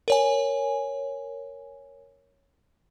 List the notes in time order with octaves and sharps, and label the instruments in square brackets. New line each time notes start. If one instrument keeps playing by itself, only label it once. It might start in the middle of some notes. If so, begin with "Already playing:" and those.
[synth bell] A#4 C#5 G#5